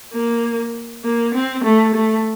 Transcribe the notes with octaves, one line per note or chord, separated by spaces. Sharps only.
A#3
A#3
C4
A3
A3